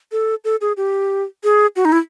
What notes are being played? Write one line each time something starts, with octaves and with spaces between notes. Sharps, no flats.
A4
A4
G#4
G4
G#4
F#4
D#4
E4